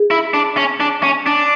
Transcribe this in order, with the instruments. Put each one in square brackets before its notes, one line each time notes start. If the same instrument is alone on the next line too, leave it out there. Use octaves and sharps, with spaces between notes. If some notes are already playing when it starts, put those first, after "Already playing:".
Already playing: [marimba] G#4
[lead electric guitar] E4
D4
C#4
D4
C#4
D4